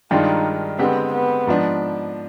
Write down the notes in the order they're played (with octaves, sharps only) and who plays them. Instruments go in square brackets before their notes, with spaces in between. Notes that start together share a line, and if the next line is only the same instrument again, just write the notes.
[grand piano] G2 D#3 G#3 D4 F4 [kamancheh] D#4
[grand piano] D3 G#3 C4 G4 [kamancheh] B3
[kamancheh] B3
[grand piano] G#2 F3 B3 D4